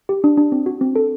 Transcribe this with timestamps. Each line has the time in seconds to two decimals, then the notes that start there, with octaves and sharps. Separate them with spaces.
0.09 G4
0.24 D4
0.37 D4
0.52 C4
0.66 F#4
0.81 C4
0.96 A4